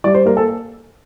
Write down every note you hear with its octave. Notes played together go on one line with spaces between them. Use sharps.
G3 D5
C5
A#3 A#4
A4